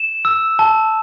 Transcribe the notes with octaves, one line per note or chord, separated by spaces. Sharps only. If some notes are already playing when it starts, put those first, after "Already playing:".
Already playing: E7
E6
A5